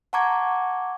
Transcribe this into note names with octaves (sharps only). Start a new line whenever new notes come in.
F#5 A5 A#5 C#6 D6 G#6